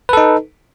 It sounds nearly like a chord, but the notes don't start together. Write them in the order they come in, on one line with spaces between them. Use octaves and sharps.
B4 A4 D#4